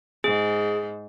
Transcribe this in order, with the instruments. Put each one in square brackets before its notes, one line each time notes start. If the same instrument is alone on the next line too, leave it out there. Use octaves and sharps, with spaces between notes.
[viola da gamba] G#2 [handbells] G#4